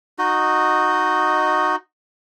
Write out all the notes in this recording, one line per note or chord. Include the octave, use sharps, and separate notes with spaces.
D#4 F#4 D#5